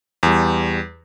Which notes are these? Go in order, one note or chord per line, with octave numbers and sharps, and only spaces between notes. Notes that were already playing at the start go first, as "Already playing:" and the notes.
E2 G3